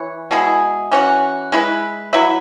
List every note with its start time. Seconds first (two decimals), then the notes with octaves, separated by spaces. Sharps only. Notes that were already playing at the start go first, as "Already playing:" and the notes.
Already playing: E3 E4 C#5
0.31 B2 G#3 E4 G#4
0.92 E3 C#4 F#4
1.52 G#3 E4 B4
2.13 F#3 E4 B4 E5